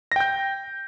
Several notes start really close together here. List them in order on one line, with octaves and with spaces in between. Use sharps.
A#6 G5 G6